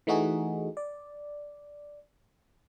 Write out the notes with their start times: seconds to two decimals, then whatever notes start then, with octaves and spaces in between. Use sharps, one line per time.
0.07 E3 A3 D#4 F#4 G#4
0.77 D5